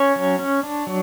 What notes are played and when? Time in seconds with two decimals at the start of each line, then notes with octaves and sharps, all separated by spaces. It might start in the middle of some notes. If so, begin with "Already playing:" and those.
Already playing: C#4 C#5
0.16 F#3
0.39 C#4
0.63 D4
0.87 F#3